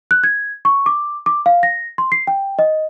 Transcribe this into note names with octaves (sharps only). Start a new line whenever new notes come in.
F#6
G#6
C#6
D6
D6
F5
A#6
C6
C7
G5
D#5